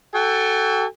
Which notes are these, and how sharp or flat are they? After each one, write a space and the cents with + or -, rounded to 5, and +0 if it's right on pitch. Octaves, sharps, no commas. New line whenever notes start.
F#4 +30 A4 +0 G5 +45